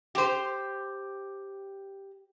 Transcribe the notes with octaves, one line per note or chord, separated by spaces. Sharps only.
G4 C5